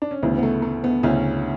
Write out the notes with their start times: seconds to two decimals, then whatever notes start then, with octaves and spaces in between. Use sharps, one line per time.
0.02 D4
0.11 C#4
0.23 D2 C#3 E3 B3
0.38 B3
0.43 A3
0.62 A3
0.84 B3
1.03 D2 C#3 E3 C#4